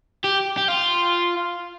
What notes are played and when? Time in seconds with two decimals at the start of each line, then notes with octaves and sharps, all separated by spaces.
0.24 G4
0.57 G4
0.68 F4